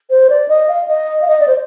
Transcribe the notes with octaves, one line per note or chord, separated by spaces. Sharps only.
C5
D5
D#5
F5
D#5
F5
D#5
D5
C5